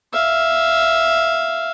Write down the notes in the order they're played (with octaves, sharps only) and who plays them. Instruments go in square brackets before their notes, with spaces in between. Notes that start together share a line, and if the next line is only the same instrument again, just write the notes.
[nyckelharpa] E5 F5